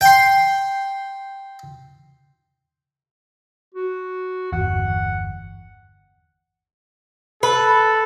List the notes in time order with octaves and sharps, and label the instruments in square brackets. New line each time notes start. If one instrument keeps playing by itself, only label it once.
[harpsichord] G5 C6
[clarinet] F#4
[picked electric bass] G1 E2 [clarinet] F#5
[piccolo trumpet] A4 [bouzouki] B4